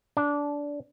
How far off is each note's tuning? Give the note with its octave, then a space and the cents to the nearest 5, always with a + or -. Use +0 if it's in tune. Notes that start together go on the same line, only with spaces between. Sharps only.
D4 -15